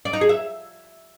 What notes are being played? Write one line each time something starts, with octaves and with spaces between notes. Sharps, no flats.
D5
D#4
G#4
E5